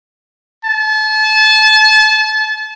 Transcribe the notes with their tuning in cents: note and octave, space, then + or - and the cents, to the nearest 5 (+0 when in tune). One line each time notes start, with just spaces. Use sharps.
A5 -30